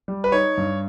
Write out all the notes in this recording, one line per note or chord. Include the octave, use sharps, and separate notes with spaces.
G3
B4
D#4 C#5
G2